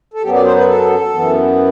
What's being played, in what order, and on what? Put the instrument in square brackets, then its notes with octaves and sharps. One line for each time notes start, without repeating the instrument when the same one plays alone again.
[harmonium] A4
F#2 F#3 B3 G4
D5
C5
B4
A4
F#2 E3 B3